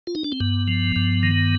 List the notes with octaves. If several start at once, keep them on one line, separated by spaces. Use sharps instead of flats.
F4
D#4
D4
C4
G2 B3
F3
G2
D#3